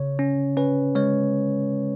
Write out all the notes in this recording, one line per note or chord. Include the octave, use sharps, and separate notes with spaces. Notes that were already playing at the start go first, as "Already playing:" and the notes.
Already playing: C#3 C#5
C#4
C#4 B4
G#3 C#5